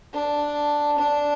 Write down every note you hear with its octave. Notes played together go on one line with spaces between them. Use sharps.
D4
D4